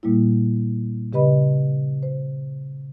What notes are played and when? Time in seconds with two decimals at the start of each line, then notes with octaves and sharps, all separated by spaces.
0.03 A#2 G3 A#3 E4
1.13 C#3 G4 B4 D#5 B5
2.03 C5